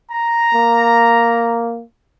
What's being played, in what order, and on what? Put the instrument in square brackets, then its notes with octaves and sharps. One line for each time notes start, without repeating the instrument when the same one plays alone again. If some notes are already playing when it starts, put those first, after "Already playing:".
[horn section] A#5
[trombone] A#3